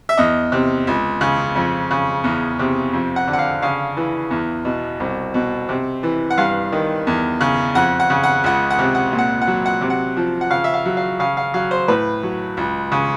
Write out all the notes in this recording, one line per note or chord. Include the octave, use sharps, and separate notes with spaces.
E5
E2 D#5
C3
C#2
C#3
F2
C#3
E2
C3
F2
F#5
D3
F#5
F5
C#3 F5
E3
E2
B2
C2
B2
C3
E3
F#5
G2 F5
D#3
E2
C#3
F2 F#5
F#5
C#3
F#5
C#2 F#5
F#5
C3
F#5
A#2
F#5
F#5
F#3
F#5
C3
F#5
F3
F#5
C#3 F5
E5
F5
F#3
F5
C#3 F5
F5
F#3 F5
C5
A2 B4
F#3
C#2
C#3